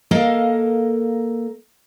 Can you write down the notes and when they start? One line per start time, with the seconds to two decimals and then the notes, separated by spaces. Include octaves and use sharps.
0.11 A#3 A4 A#4 D#5 F5